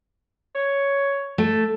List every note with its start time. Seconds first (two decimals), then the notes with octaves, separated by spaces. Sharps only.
0.55 C#5
1.38 A3